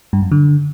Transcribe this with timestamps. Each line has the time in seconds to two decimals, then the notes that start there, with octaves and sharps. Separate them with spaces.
0.13 G2
0.22 F#2
0.32 D3